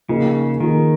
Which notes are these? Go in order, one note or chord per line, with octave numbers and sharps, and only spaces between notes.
C#3 F3 A#3 D#4 G#4
D#3 F3 A#3 D#4 G#4